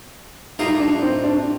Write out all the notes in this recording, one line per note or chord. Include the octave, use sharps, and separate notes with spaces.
A2 G3 A#3 D#4 F4 A#4
D4
C4
D4